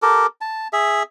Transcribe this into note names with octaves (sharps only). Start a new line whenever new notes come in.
G4 A4 A#4
A5
G#4 E5